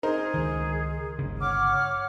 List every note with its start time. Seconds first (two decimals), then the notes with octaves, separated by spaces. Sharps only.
0.03 D#4 G#4 A#4 C5
0.34 C#2 D#3
1.19 G1 C#3
1.41 C#5 F#5 D6 F6